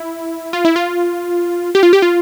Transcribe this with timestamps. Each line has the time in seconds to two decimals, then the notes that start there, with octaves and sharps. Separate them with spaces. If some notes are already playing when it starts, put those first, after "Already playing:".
Already playing: E4
0.53 F4
0.65 E4
0.76 F4
1.75 G4
1.83 F4
1.93 G4
2.02 F4